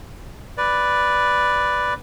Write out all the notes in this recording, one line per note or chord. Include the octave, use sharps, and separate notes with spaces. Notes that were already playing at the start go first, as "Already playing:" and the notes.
B4 D5